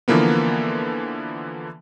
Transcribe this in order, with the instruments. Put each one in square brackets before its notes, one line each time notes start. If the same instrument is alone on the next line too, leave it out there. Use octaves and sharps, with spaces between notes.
[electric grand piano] D3 E3 F3 A#3 B3